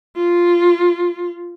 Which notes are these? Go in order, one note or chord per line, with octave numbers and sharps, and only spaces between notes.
F4